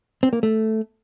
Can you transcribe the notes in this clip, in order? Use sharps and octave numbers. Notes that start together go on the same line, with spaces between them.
C4
A#3
A3